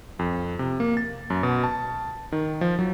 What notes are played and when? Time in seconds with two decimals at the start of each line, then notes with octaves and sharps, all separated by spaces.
0.19 F2
0.59 C3
0.80 A#3
0.97 A6
1.30 F#2
1.43 B2
1.64 A5
2.32 D#3
2.61 F3
2.79 F#3